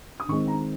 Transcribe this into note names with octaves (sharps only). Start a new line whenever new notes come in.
D#6
D#3 G#3 C4 C#6
A#5